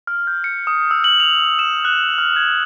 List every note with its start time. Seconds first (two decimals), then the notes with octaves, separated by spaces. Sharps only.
0.07 F6
0.27 G6
0.44 C#7
0.67 D#6
0.91 E6
1.04 F#7
1.20 F7
1.59 E7
1.85 F#6
2.18 F6
2.36 G#6